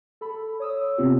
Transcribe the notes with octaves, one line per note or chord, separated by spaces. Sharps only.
A4 B5
C#5 D#6 E6
C3 B3 C4 F4 G4